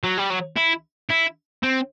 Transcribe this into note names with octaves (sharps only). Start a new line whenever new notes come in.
F#3
G3
F#3
E4
E4
C4